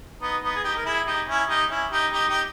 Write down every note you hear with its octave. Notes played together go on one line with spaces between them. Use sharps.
B3 D#4
B3 D#4
G#4
D#4 G4
A#4
E4 G#4
D#4 G4
C#4 E4
D#4 G4
C#4 E4
D#4 G4
D#4 G4
D#4 G4